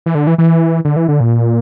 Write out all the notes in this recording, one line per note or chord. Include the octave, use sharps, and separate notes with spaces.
E3
D3
E3
E3
D3
E3
D3
A#2